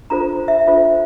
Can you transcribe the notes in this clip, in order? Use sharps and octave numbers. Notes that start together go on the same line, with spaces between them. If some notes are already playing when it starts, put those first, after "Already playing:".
D4 F4 A4 C5 A#5
E5
D4 F4 A4 C5